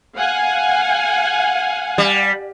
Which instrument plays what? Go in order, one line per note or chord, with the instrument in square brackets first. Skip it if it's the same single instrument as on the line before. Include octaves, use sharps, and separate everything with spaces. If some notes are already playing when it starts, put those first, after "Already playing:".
[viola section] F5 F#5 G#5
[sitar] G3